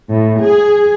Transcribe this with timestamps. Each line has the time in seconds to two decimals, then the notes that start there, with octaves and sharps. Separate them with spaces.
0.11 A2
0.43 G#4